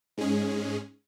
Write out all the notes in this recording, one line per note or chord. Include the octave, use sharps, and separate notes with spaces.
G#2 G#3 C#4 G#4